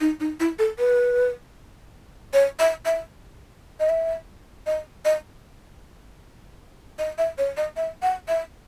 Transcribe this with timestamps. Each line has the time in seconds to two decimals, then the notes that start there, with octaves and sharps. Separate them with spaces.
0.01 D#4
0.20 D#4
0.40 E4
0.59 A4
0.79 B4
2.34 C#5
2.60 E5
2.86 E5
3.80 D#5
3.89 E5
4.66 D#5
5.05 D#5
6.99 D#5
7.18 E5
7.38 C#5
7.57 D#5
7.77 E5
8.02 F#5
8.28 E5